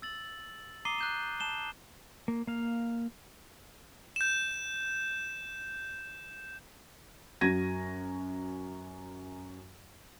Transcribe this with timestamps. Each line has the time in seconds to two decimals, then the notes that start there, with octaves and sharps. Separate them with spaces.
0.02 E6 A6 F#7
0.85 A#5 D6 D#6 C7 D#7 G7
0.98 F#6 G6 E7
1.40 A5 E7 G7
2.28 A#3
2.47 A#3 F5
4.16 G6 E7
7.41 F#2 F#4 G#6 A#6 D#7